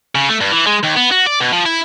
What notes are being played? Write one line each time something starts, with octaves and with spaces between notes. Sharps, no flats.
C#3
A3
G2
E3
G#3
D#2
B3
F#4
D5
B2
F3
E4